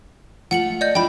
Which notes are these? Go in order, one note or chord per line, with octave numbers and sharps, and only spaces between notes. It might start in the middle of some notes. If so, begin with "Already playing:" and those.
A3 F4 F#5 C#7 F#7
D5 D#5 G6
D4 E4 F4 G5 B5